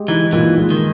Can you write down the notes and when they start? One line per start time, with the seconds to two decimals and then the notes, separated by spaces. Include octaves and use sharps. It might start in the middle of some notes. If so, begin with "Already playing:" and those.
Already playing: G#3 G4
0.08 E3 D#4
0.33 A#2 E3
0.58 G#3
0.70 D#3